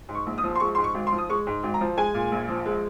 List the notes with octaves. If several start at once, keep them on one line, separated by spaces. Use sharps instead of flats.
G#2
C#6
A#1
D#6
F3
C6
G#3 C#6
G#2 C6
C#6
G#1
C6
F3
D#6
G#3 C#6
G#2
G#1
A#5
F3
G#3 G#5
A#2
A#1
F3
G#3